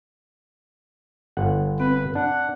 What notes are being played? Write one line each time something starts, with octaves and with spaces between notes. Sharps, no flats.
G1 F#5
C4 B4
D4 F#5